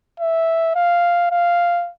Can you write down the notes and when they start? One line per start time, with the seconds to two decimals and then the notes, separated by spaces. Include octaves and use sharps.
0.20 E5
0.75 F5
1.31 F5